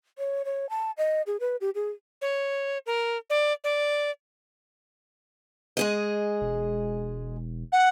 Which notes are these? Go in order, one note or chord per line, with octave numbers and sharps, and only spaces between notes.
C#5
C#5
A5
D#5
G#4
B4
G4
G#4
C#5
A#4
D5
D5
G#3 G#4 D#5
E1
F#5